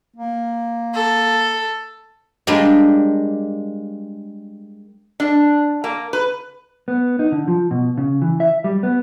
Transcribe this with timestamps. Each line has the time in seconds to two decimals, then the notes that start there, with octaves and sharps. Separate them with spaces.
0.16 A#3
0.95 A4
2.47 G3 G#3 A#3 D4 G4
5.20 D4
5.84 A#3
6.13 B4
6.88 B3
7.19 D#4
7.32 D3
7.48 F3
7.71 B2
7.97 C#3
8.22 E3
8.40 E5
8.64 G3
8.83 B3